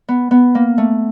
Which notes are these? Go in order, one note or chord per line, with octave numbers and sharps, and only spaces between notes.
B3
B3
A#3
A3